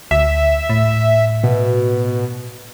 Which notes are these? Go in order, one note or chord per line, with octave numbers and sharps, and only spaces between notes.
D2 E5
A2
B2